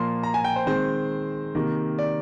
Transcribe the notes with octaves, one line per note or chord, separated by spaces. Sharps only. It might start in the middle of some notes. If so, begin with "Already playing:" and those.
Already playing: A#2 F3 A#3 C6
A#5
G#5
G5
C5
D#3 G#3 C4 C5
C3 D#3 A#3
D5